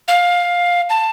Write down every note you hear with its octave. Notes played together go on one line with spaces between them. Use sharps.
F5
A5